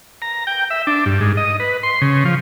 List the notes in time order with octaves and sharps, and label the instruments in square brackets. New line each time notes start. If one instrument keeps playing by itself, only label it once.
[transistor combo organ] A#5
G5
E5
D4
G2
G#2
D#5
B4
C6
C#3
F3